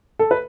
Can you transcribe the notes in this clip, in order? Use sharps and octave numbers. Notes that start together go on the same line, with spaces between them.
A4
B4